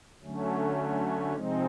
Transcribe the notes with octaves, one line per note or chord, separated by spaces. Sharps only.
D3 F#3 A3 C#4
C3 F3 G#3 C4 D#4